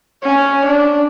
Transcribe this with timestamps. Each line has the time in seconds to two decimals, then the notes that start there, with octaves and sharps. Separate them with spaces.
0.24 C#4
0.66 D4